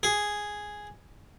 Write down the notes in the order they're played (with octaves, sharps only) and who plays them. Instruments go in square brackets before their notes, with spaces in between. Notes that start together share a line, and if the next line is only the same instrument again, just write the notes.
[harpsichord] G#4